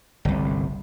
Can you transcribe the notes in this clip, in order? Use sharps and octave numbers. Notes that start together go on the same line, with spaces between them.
G1 C2